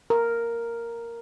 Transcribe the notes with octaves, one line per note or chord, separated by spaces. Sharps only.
A#4